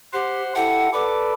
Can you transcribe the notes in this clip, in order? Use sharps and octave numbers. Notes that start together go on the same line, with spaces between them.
G4 C5 F#5 C6
E4 G4 A4 F#5
A4 B4 D5 D6